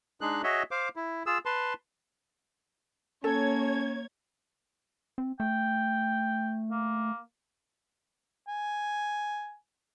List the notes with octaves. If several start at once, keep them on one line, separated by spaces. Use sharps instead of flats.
G#3 D4 D#4 G#4 F#6
F#4 G#4 C#5 D#5 E5
C5 F5 D6
E4
F4 G#4 E6
B4 A5 C6
A#3 C#4 A4 C#5 G#6
C4
A3 G5
A#3
G#5